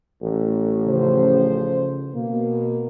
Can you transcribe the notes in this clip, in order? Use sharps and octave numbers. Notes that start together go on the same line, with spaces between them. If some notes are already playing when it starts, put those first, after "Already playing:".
A1
C#3 F3 C5
B2 A#3